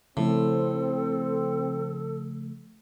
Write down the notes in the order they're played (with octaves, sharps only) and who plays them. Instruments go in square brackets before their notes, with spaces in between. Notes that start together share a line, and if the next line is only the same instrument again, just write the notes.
[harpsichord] A2 [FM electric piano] C#3 F3 A3 [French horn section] C4 [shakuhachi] A4